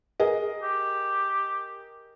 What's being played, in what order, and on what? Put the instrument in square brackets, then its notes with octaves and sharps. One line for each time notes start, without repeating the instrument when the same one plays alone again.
[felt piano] G#4 A#4 D#5
[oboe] G4